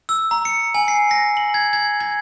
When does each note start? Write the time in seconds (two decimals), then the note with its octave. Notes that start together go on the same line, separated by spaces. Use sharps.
0.09 E6
0.31 A#5
0.45 C#7
0.75 G#5
0.88 C7
1.11 A#6
1.37 F#7
1.54 G#6
1.73 G#6
2.01 G#6